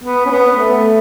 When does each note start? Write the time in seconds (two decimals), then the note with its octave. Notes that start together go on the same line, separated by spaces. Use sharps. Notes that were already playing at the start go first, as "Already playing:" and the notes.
0.03 B3
0.25 C#4
0.31 B3
0.57 A3